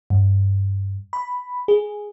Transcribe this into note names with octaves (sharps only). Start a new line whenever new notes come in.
G2
B5
G#4